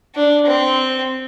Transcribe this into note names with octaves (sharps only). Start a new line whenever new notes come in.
D4
C4